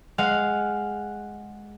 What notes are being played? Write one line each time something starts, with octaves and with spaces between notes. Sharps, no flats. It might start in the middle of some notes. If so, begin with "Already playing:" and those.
G#3 F5 F#5